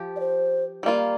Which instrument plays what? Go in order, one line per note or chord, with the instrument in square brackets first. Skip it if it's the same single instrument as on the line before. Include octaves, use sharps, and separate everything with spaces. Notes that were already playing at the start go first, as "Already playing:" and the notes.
Already playing: [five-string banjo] F3 G4
[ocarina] D5
C5
[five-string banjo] G3 A#3 F4 [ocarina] D5